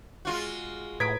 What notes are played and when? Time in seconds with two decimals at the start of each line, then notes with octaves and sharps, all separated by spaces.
0.25 G#3 F4 F#4
1.00 A2 B4 A#5 D#6 G#6 B6 D7